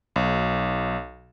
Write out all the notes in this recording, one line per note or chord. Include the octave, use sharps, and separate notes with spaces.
B1